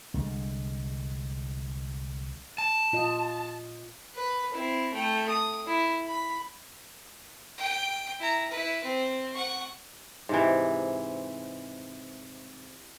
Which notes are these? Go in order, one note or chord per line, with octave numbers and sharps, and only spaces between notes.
C2 D3 F#3 G#3
A5
A#2 F4 D#5
B4
C4 E4
A3 G5
D#6
E4
B5
G5
E4 A#5
E4 B4
C4
F#5 C#6
G#2 C3 E3